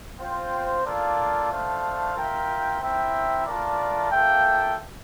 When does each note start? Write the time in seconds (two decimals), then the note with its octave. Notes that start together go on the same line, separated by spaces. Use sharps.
0.20 C4 F4 C5 G5
0.86 A#3 D4 F4 A4 D5
1.51 A3 D4 A4 C5 F5
2.16 F4 A#4 E5 G5
2.81 C4 E4 A#4 E5 G5
3.47 A3 D4 F4 A#4 D5
4.12 A#3 F4 A4 E5 G5